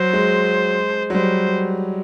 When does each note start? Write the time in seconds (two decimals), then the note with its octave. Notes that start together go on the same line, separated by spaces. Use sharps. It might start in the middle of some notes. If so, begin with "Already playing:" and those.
Already playing: F#3 C5
0.13 G#3
1.10 F#3
1.15 G3 C5